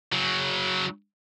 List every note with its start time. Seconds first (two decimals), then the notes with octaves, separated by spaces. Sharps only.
0.13 C#3 F#3